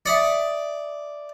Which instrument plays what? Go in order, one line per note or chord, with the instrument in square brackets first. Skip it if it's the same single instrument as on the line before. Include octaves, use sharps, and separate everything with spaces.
[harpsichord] D5 [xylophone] E5 D#6 C#7